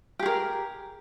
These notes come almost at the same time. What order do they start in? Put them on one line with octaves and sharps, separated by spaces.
G4 G#4 A#4